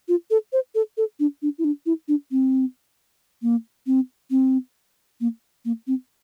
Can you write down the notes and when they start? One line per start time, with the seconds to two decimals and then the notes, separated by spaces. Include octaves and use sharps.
0.08 F4
0.31 A4
0.53 C5
0.75 A4
0.97 A4
1.20 D4
1.42 D4
1.58 E4
1.64 D4
1.86 E4
2.08 D4
2.31 C4
3.42 A#3
3.87 C4
4.31 C4
5.21 A#3
5.65 A#3
5.87 C4